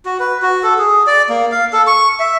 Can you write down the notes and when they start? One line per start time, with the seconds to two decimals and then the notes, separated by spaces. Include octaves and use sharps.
0.05 F#4
0.20 B4
0.42 F#4
0.63 A4
0.78 G#4
1.07 D5
1.29 A#3
1.52 F5
1.73 A4
1.87 C#6
2.20 E5